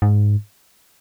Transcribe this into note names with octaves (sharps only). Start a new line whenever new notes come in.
G#2